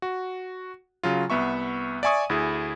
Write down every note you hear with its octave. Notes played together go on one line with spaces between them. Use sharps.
F#4
C#3 F#3 F4
C2 B3 E5 C#6
D5 E5 G#5 C#6 D#6
D2 E4 G#4